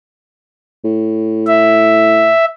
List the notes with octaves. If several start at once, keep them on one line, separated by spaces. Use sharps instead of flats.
A2
E5